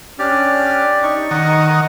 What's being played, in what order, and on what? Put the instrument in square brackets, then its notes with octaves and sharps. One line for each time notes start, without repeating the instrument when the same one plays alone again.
[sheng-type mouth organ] C#4 D4 F6 [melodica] G4 D5
[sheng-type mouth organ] D#4 C#6
[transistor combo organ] D#3 [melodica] D#5 F#5